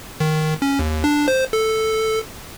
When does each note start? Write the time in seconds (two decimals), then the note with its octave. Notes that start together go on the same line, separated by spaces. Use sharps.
0.20 D#3
0.62 C#4
0.79 D#2
1.04 D4
1.28 C5
1.53 A4